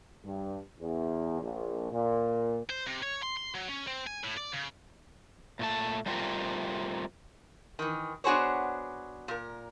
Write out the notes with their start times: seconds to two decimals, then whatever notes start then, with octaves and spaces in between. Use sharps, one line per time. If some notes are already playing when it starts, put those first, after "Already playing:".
0.24 G2
0.79 E2
1.41 A#1
1.91 A#2
2.70 C5
2.87 C3
3.03 C#5
3.23 C6
3.37 C6
3.55 F#3
3.69 C#4
3.87 C4
4.07 G#5
4.24 A2
4.37 D5
4.54 C#3
5.59 A#2 A3 A5
6.06 G3 A3 C4 F4 G4 A#4
7.79 D#3 E3
8.24 B3 D4 F#4 G#4 C5 C#5
9.28 A#2 A#4